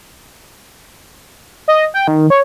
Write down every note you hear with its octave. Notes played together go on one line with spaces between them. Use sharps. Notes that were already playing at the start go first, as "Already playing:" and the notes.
D#5
G5
D#3
C#5